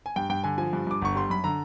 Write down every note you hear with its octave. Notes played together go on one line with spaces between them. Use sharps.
G#5
G2 G5
G2 G5
D3 G#5
F3 G#5
G2
G2 D6
G1 C#6
G3 C6
F#2 B5
D3 A#5